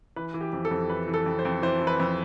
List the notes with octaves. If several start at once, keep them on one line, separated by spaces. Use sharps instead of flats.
E3 B4
E3
G4
F2
A4
F2
E3 B4
E3
A4
F2
C5
F2
E3 C5
E3
B4
F2